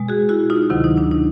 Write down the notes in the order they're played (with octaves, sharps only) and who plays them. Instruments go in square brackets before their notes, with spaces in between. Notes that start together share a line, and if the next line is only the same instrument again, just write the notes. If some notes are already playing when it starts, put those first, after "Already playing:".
Already playing: [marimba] B2 G#3
F#4 G#4
E4 F#4
D#4 F4
D2 C3 D#3 F#3 E4
D#4
D4
D#4